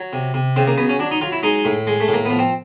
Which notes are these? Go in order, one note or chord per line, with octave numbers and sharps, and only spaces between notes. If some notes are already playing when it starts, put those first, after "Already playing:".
Already playing: F#3
C3
C3
C#3 C4
A#3
F#3 B3
C#4
F#3 D4
D#4
F#3 F4
E4
G#3 D#4
A2
G#3
A3
A2
A#3
F3 B3
C4